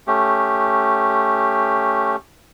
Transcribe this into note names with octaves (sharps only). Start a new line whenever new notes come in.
A3 C#4 G4